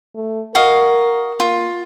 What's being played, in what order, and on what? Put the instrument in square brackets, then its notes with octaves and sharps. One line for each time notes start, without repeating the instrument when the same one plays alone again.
[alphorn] A3
[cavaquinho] F#4 D#5 F5 [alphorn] A#4
[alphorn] A#3 [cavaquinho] F4